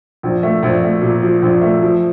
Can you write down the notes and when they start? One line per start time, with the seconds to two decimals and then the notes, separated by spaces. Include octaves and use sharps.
0.23 A#1
0.43 A3
0.63 A#1
0.83 A3
1.02 A#2
1.23 F3
1.42 A#1
1.62 A3
1.82 F3